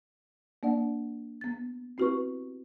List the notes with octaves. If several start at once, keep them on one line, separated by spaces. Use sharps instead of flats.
A#3 D4 D5 F#5
B3 A6
C4 E4 F#4 G4 B4 C#6